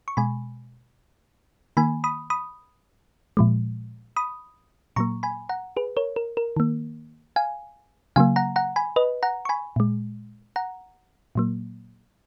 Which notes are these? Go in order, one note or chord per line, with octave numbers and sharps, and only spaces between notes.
C#6
B2 G#3 G#5 B5
D#3 A#3 G#5 B5
B5 D#6
B5 D#6
A#2 F3 G#3
B5 D#6
A#2 F#3 A#3 A#5 C#6
G#5 B5
F#5 A#5
G#4 B4
A#4 C#5
A#4
A#4
D#3 A#3
F5 G#5
C#3 F#3 A#3 F5 G#5
F#5 A#5
F#5 A#5
G#5 B5
B4 D#5
F#5 A#5
C#6
G#5 B5
A#2 G#3
F#5 A#5
A#2 F#3 A#3